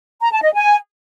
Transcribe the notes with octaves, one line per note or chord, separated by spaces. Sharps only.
A#5
A5
D#5
G#5